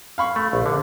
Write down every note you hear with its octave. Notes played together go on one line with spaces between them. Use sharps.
F5 B5 C#6
A3
A#1
D3